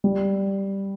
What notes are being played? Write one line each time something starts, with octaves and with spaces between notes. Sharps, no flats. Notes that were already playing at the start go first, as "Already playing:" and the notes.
G3